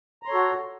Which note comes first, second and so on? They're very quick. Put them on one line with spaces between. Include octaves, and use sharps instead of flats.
A#5 C6 C#5 A4 F#4